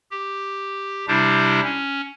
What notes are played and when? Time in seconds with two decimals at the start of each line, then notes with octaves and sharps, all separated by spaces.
0.11 G4
1.08 C3 G3 D4 E4 G4 C5
1.64 C#4